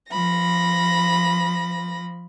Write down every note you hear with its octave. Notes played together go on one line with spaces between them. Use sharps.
F3 B5 A#6